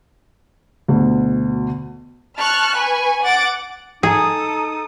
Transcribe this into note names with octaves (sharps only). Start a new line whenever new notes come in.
D2 B2
A5 C#6 F6 F#6
B4 G#5 C#6
F#5 D6 A6 D7
D#4 G#4 A4 D#6